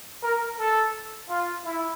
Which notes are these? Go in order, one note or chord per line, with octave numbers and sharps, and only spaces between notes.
A#4
A4
F4
E4